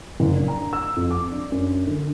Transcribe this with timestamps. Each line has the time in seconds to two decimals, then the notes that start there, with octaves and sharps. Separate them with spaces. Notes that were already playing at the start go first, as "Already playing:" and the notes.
0.20 F#1
0.34 D4
0.48 A#5
0.73 E6
0.96 F2
1.11 D6
1.31 D4
1.52 F#2
1.87 D3